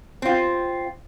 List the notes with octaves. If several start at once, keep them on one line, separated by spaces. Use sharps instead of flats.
C4 F4